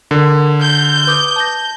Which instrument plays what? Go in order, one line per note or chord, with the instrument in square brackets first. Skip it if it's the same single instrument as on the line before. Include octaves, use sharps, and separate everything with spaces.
[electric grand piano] D3 [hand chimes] A#4
[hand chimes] F6 [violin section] G6
[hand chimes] B4 D6 D#6
A5 A#6